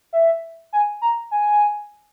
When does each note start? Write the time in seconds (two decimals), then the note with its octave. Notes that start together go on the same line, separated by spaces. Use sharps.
0.13 E5
0.73 G#5
1.02 A#5
1.31 G#5